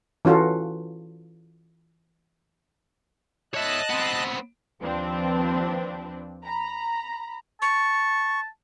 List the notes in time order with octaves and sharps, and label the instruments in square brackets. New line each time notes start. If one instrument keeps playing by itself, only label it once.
[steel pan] E3 C#4 F4 F#4 A4
[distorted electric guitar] C#5 E5 [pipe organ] D#5 A5 F#6
[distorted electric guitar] B3 C4
[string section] D#2 F3 C4 D4 B4
A#5 B5
[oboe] A5 [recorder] C#6